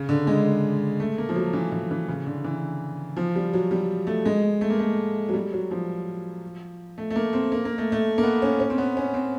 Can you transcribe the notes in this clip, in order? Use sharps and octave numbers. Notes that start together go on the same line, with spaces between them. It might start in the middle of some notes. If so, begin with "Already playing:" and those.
Already playing: C#3
D3
G#3
A3
A#3
F3
F#3
E3
E3
E3
C#3
D3
E3
F3
G3
F#3
G3
A3
G#3
A3
A#3
A3
F#3
G3
F#3
F3
A3
A3
A#3
C4
A#3
A#3
A3
A3
A#3
B3
C#4
C#4
C4
B3
C#4
C4